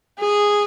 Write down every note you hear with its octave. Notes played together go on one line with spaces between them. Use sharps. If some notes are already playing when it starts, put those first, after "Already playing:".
G#4